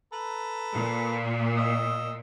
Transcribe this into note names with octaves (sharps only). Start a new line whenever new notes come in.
A4 B4 A#5
A#2
D#5 E6